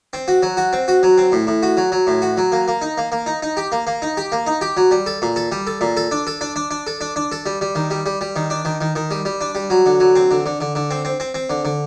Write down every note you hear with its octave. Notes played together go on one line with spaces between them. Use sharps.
C4
F#4
F#3
F#4
C4
F#4
F#3
C4
A2
A2
F#4
F#3
F#3
A2
F#4
F#3
A#3
A#3
D#4
A#3
A#3
D#4
D#4
G4
A#3
A#3
D#4
G4
A#3
D#4
G4
F#3
G3
A4
A#2
A4
G3
A4
A#2
A4
D4
A4
D4
D4
D4
A4
D4
D4
A4
G3
G3
D#3
G3
G3
G3
D#3
D4
D#3
D#3
D#3
G3
G3
D4
G3
F#3
D3
F#3
C4
D3
D3
D3
D3
C4
C4
C4
C4
D3
D3